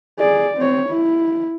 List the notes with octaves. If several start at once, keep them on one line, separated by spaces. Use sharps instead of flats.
G#4 D5
C4 C#5
E4